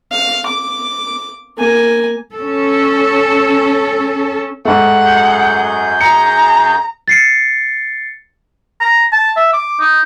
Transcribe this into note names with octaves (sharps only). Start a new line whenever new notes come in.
F5
D6
A#3 G#5
C#4 A4
G#2 A3 F#5
F#2 G#4 G6
A#5 C#7
A6 C7 C#7
A#5
A5
E5
D6
D#4